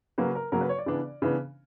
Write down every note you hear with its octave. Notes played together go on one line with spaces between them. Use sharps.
C#3 F#3 A#3 B4
A#4
C#3 F#3 A#3 A#4
B4
C#5
D5
C#3 E3 B3 D4
C#3 E3 B3 D4